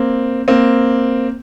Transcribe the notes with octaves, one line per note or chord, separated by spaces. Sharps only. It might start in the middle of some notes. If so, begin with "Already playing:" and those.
Already playing: A#3 C4
A#3 C4